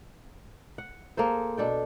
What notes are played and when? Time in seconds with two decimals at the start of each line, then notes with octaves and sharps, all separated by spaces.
0.78 F#5
1.17 A#3 G#4 A4 C5
1.57 B2 D4 A4 G5